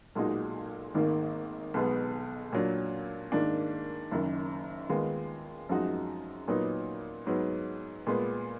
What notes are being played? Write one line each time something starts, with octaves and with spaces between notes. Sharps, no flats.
B1 A#2 G#3 D#4 F#4
G#1 G#2 D#3 A#3
B1 B2 G#3 B3
A#2 F#3 D4
G#2 D#3 A#3 D4
F#1 F#2 D#3
D#2 D#3 G#3 B3 F4
F#2 F3 G#3 D#4 F#4
A#2 F#3 B3 D#4
G#2 F#3 B3
A#2 G#3 B3